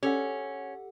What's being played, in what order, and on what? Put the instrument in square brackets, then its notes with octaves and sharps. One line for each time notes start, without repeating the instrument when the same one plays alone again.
[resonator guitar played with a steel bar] C#4 [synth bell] G4 A4 F#5